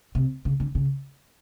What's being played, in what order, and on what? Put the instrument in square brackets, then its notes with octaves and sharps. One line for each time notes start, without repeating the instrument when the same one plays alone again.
[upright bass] C3
C#3
D3
C#3